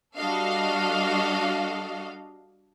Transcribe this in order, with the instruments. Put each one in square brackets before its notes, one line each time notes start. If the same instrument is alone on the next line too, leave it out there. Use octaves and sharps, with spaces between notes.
[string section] G3 D4 F#4 A4 D#5 F5